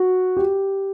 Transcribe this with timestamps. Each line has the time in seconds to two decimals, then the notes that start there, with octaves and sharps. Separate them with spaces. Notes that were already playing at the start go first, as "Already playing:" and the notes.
Already playing: F#4
0.37 G4